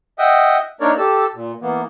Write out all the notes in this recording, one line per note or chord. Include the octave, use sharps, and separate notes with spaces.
D#5 E5 F#5 G5 D#6
A#3 D4 D#4 A#4 C#5 D5
G4 A4 A5 E6
A#2
E3 A#3 B3